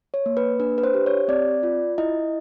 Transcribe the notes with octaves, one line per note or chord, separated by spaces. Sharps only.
C#5
A#3
B4
D4 B4
B4
C5
G4
C#5
C4 D5
F4
E4 D#5